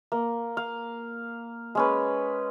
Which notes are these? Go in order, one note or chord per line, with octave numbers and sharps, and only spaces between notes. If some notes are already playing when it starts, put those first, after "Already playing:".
A#3
F5
G#3 C#4 B4